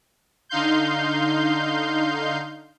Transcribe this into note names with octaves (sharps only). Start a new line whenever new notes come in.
D3 D#4 F5 C6 G6